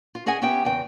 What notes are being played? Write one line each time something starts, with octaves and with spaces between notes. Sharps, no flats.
F4
C#4 G#4 D#5 F#5 G#5
B3 C#4 G4 E5 G5
E2 C#3 G5